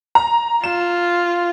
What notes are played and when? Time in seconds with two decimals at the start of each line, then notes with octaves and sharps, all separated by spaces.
0.15 A#5
0.64 F4 E7